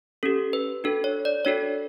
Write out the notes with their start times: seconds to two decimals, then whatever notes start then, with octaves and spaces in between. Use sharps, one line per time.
0.23 C#4 G4 A4
0.53 B4
0.84 D4 F#4 A4
1.04 C#5
1.25 D5
1.45 D4 F#4 A4 C#5